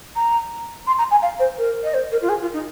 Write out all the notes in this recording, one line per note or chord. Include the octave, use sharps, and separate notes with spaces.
A#5
C6
A#5
G#5
F5
C5
A#4
D#5
C5
A#4
F4
G#4
F4
D#4